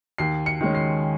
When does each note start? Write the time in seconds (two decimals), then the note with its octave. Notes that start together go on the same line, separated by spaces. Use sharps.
0.18 D#2 C7
0.46 C#7
0.61 D#3 G#3 C#4
0.75 C7